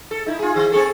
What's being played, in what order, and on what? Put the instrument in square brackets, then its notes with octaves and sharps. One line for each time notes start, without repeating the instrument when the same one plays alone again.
[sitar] A4
D#4 E4
F4 G#4
D#3
C4 G#4 A4